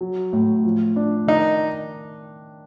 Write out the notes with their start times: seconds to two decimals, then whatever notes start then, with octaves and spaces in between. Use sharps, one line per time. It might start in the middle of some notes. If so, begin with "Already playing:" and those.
0.01 F#3
0.33 A2
0.64 F3
0.96 D4
1.27 D#3 D#4